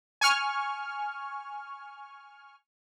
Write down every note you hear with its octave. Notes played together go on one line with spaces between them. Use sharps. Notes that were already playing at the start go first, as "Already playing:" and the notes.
G#5 C#6 F6